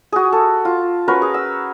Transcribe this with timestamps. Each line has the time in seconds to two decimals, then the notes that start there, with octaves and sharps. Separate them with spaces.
0.12 F#4 G#4
0.33 A4
0.65 F4
1.08 C#4 F#4 A#4 B4
1.22 G#4
1.34 E6